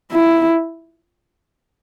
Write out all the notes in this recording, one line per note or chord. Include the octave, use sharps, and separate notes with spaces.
E4